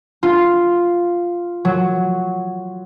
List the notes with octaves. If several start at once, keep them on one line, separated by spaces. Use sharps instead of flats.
F4
F#3